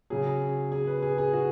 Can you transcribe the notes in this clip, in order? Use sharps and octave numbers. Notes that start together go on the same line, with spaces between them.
C#3 F#3 G#4
G#4
B4
G#4
G#4
F#4